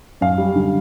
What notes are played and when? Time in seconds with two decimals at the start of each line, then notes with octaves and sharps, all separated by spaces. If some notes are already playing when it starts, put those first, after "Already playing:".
0.21 F#2 F5
0.38 G3
0.56 D3